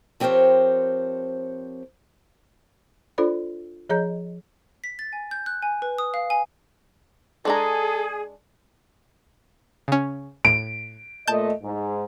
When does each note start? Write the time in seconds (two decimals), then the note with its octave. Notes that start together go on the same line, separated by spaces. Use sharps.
0.20 F3 C4 G4 A#4 C5 C#5
3.18 D4 F4 A4 C5 D5 B5
3.90 F3 G#4 C#5 D#5 A#5 G6
4.84 B6
4.99 A6
5.13 G#5
5.31 G6
5.46 F#6
5.62 G#5
5.82 B4
5.98 D#6
6.14 F5
6.30 G#5
7.45 G#3 D4 G#4 A4 A#5
9.88 C#3 C#4
10.45 A2 D7
11.27 A#2 A3 D#5 A5 G6
11.63 G#2